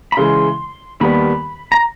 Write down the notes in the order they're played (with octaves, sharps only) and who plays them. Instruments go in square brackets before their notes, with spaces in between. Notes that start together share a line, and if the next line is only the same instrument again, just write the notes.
[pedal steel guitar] B5
[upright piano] C#3 E3 G#3 [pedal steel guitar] C6
[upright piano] D#2 D#3 G3 B3 [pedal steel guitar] B5
[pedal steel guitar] A#5